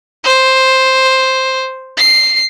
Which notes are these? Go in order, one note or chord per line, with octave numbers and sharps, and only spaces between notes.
C5
C7